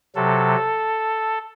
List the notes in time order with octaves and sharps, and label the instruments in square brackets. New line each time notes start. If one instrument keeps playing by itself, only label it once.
[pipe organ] C3 F#3 A4